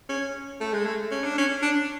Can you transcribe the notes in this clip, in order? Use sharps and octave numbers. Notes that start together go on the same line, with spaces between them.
C#4
A3
G#3
A3
C#4
D4
C#4
D4